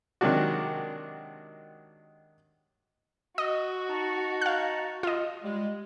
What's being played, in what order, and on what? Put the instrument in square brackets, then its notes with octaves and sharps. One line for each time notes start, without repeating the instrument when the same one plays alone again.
[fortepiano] C3 D#3 F#3 G#3 D4 F#4
[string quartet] F#4 [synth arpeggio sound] D#5
[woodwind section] D#4 A5 A#5
[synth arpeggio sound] F5 F#6
F4 D#5
[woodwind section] G3 G#3